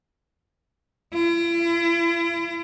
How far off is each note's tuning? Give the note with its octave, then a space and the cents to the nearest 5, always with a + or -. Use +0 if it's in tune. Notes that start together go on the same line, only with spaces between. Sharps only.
E4 +45